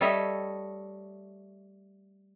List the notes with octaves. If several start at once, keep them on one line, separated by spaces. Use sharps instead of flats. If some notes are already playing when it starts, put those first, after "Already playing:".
G3 A3 A4 C#5 D#5 E5